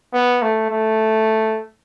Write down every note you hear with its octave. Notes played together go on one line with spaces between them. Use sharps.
B3
A3
A3